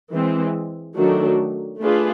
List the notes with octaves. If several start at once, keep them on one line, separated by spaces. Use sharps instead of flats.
E3 G#3 C4
D#3 F#3 A3 D4 F#4
A3 D4 F4 G#4 B4